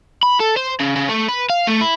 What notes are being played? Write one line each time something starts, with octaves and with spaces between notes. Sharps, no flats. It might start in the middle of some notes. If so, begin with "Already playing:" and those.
B5
A4
C5
C#3
C#3
A3
B4
F5
A3
E4